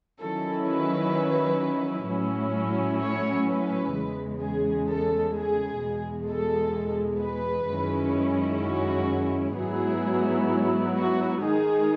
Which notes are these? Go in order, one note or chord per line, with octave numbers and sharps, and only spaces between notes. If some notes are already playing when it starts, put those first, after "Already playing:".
D#3 F#3 C#4 E4 A4
B4
A2 F#3 C#4 E4
C#5
B4
E2 C#3 G#3
G#4
A4
G#4
E2 B2 G#3
A4
B4
F#2 D#3 G#3 C#4 E4
F#4
G#2 F#3 B3 E4 G#4
F#4
D#3 G#3 D#4 G#4